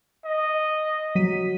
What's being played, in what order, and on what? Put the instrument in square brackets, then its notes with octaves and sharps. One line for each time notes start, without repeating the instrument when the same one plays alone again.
[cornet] D#5
[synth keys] F#3 B6 D#7